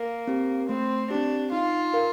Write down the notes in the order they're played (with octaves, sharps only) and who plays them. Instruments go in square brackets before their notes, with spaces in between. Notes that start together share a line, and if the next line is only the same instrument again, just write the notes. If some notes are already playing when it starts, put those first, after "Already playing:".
Already playing: [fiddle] A#3
[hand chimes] C4 G4
[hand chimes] A3 [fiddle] C4
[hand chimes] C4 G4 [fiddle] D4
[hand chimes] D#4 [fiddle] F4
[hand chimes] A#4 F5